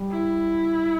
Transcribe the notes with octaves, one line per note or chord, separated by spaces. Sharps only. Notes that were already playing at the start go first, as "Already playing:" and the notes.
Already playing: G3
E4